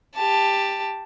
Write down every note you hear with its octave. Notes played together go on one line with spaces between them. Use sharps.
G4 A5